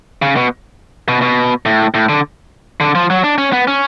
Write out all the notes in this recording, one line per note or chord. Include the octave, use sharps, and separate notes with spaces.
C#3
B2
B2
B2
A2
A2
D3
D3
F3
F#3
D4
C#4
B3
C#4